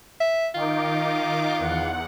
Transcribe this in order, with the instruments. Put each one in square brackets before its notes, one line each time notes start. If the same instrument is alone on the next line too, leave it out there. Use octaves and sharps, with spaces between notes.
[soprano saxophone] E5
[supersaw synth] D#3 D#4 D6 [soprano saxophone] F4
[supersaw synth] E2 F#5